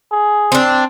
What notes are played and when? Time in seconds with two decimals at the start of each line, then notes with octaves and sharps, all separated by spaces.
0.12 G#4
0.52 C4 D4